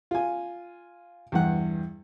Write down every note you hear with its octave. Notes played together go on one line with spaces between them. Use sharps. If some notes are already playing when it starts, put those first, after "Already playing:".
F4 G#5
E2 G2 F#5